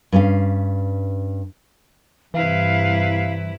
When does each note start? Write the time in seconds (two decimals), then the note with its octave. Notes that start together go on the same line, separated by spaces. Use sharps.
0.12 G2 C#4 F5
2.34 G2 C3 E3 G3 E4 B4 F5